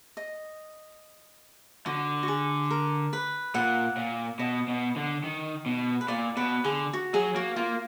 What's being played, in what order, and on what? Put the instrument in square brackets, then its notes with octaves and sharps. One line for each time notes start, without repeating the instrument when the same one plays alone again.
[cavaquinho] D#5
[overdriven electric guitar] D3 [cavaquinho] F#4
[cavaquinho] F#4
G#4
A#4
B4
[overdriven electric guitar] A#2 [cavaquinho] F#5
[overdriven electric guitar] A#2
[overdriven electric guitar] B2 [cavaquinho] D#5
[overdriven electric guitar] B2
D3
D#3
B2
[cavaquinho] B4
[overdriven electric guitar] A#2 [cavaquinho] D5
[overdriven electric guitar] B2 [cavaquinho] B4
[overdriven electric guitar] D3 [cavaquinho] G#4
[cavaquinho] F#4
[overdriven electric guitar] F#3 [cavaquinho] G#4
[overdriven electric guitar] A#3 [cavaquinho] F#4
[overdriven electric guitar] A#3 [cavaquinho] F4